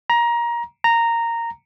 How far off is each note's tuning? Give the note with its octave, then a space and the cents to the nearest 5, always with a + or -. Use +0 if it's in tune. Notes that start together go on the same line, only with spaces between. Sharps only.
A#5 +20
A#5 -10